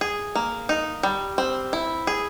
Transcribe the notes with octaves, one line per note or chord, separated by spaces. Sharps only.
G#4
A#3
D#4
G3
C4
E4
G#4